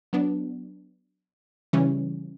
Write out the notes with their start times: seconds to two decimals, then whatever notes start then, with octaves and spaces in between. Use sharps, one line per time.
0.13 F#3 B3 D4
1.73 C#3 E3 G3 C#4